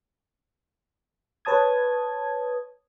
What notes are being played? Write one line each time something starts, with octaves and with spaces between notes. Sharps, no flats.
B4 C#5 A5 D#6 G#6